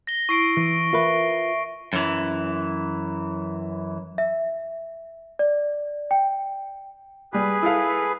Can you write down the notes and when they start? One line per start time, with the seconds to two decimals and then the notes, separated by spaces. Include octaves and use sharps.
0.07 A#6 G7
0.29 E4 C#6 C7 D7
0.57 E3
0.93 F4 A#4 B4 E5
1.93 F#2 E3
4.18 E5
5.39 D5
6.11 G5
7.33 G3 G4 G#4 B4
7.62 E4 A4 F5